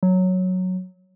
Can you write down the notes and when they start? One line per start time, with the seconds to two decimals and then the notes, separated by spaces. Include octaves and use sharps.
0.03 F#3